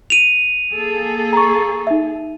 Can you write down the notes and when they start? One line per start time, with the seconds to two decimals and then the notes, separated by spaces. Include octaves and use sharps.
0.10 D#7 F7
0.74 A#3 G#4 A4
1.33 A#5 C#6
1.87 D#4 E5